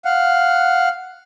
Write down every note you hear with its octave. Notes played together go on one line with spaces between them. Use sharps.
F5 F#5